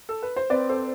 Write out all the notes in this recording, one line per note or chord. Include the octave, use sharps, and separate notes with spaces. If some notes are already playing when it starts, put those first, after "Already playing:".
A4
B4
C5
C4 B4 D5
A4 C5